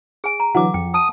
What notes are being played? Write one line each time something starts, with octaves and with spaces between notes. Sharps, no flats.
G#4 G#5
A#5
D3 E3 F#3 F#5 D6
F2 G5
A5 D#6